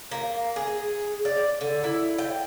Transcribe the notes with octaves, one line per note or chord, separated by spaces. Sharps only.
A#3
G#4
D5
D3
E4
G5